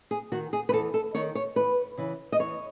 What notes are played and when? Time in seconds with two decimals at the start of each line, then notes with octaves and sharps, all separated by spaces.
0.11 G#4
0.32 D#3 F#4
0.53 G#4
0.69 B4
0.73 E2 A4
0.94 A4
1.15 D#3 C#5
1.35 C#5
1.56 E2 B4
1.97 C#3 E3
2.32 D#5
2.39 E2 C#5